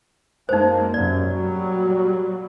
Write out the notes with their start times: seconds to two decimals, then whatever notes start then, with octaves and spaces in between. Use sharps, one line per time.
0.49 F#2 G#3 A#3 D#4 C5
0.94 F#2 C3 D5
1.24 A#2 F#3 G3